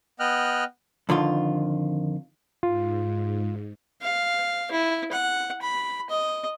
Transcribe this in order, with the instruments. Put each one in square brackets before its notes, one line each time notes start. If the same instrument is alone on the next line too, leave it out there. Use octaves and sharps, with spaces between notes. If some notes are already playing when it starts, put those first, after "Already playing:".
[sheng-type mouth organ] B3 D#5 G5 F6 F#6
[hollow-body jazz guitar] F2 D3 D#3 F4
[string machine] G#2 [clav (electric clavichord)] F4
[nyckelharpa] F5
E4
F#5
B5
D#5